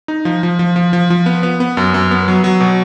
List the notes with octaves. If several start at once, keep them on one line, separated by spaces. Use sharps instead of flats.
D#4
F3
F3
F3
F3
F3
F3
B3
B3
B3
F#2
F#2
B3
F#3
F#3
B2